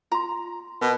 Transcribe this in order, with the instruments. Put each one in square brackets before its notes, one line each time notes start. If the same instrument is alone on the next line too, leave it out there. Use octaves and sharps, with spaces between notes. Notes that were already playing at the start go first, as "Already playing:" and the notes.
[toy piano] F4 C6 [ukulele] A#5
[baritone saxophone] B2 [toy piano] A#4